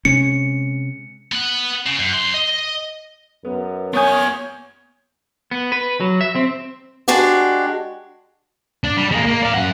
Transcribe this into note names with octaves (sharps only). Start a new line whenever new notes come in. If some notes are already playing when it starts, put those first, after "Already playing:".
C3 G#3 C#4 C#7
B3 F#5
C#3
F#2
F#2 C6
D#5
F#2 B3
B3 C#5 G#5 C#6 D#6 G6
B3
B4
F#3
E5
C4
G#3 D4 F#4 G4
D4
G3
G#3 A#3
A#3
D5 F5
F#2 F#5